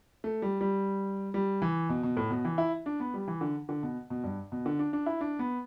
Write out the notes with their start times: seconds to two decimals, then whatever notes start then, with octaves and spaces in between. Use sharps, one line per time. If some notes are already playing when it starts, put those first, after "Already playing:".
0.24 A3
0.42 G3
0.61 G3
1.34 G3
1.62 E3
1.89 B2
2.03 B2
2.17 A2
2.30 B2
2.45 E3
2.58 E4
2.86 D4
3.00 B3
3.14 G3
3.28 E3
3.41 D3
3.69 D3
3.83 B2
4.10 B2
4.24 G2
4.52 B2
4.66 D3
4.79 D4
4.93 D4
5.06 E4
5.21 D4
5.39 B3